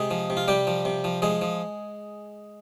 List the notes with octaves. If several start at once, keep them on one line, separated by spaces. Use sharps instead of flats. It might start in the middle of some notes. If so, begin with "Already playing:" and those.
Already playing: C3 G#3 G#4
F3
C3
F4
C3 G3 G4
F3
C3
F3
F3 G#3 G#4
F3